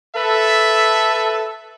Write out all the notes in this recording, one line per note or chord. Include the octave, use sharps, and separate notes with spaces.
A4 B4 E5